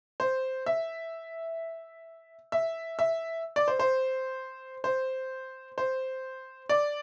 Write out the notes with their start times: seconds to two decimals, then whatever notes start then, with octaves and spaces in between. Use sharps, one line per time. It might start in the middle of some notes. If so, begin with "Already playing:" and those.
0.20 C5
0.66 E5
2.52 E5
2.99 E5
3.56 D5
3.68 C5
3.79 C5
4.84 C5
5.78 C5
6.69 D5